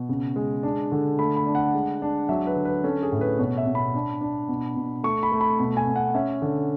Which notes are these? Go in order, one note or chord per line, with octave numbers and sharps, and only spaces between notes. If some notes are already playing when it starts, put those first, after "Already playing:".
Already playing: B2
C#3
G#3
D4
D3
A3 B5
B5
D4
F#5
G#3
D4
F#3 E5
B4
D3
B4
C#4 A4
G#4
A2
B4
B2 C#5
E5
B2
B5
D4
D4
B2
B2
A3 C#6
B5
A3
B5
B2 B5
G#5
B2
F#5
C#4 E5
D3